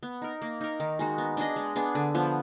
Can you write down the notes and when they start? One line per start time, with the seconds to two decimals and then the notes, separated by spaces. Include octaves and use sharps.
0.03 B3
0.22 D#4 A#4
0.42 A#3
0.61 D#4 A#4
0.80 D#3
0.99 G#3 D#4 F#4
1.18 B3
1.37 D4 G#4 D#5
1.56 G#3
1.76 B3 D4 G#4
1.95 D3
2.15 F3 B3